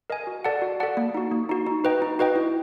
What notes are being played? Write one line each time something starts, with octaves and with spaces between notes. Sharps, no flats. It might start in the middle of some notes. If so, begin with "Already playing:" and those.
A#4 D#5 G#5
F#4
A4 D5 F#5 A5
F#4
A4 D5 F#5 A5
A#3
D#4 F#4
A#3
D#4 F#4
D#4
F#4 B4 D#5 G5
D#4
F#4 B4 D#5 G5
E4